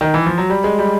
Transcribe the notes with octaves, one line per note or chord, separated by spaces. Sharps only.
D#3
E3
F3
F#3
G3
G#3
G3